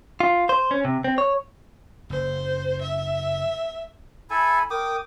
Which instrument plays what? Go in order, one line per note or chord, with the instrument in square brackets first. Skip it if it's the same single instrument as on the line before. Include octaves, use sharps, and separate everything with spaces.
[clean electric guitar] F4
C5
C#4
C3
C4
C#5
[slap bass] F#1 [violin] C5
[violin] E5
[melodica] E4 A4 G#5 [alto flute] B5
[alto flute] A#4 [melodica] G5 D6 D#6